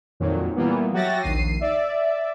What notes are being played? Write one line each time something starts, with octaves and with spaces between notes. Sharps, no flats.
F2 A#2 D#3 F#3
A#2 E3 G3 A#3 B3
F#3 F#4 G4 E5 A6 A#6
A#1 D#2 C7 D#7
D5 E5